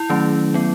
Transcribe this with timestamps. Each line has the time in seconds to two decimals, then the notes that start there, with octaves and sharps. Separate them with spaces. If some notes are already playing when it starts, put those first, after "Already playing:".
Already playing: E4
0.10 D#3 F#3 A3 C#4
0.54 F#3 B3